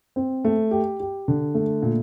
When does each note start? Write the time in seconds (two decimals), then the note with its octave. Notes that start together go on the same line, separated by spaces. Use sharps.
0.16 C4
0.45 A3
0.71 G4
1.00 G4
1.28 D3
1.55 A3
1.82 A#2